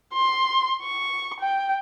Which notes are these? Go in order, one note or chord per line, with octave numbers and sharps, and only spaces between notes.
C6
C#6
G5